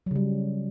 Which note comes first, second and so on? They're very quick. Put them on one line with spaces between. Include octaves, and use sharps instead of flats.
F#3 C#3 G3